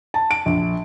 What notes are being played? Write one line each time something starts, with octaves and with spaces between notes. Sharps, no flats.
A5
D7
A#1